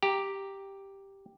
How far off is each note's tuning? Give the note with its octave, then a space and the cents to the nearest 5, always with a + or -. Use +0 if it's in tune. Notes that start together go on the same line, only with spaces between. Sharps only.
G4 +0 A#5 +0